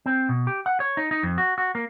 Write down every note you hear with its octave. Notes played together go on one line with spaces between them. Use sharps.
C4
B2
G4
F#5
C#5
D#4
D#4
F2
F#4
F#4
A#3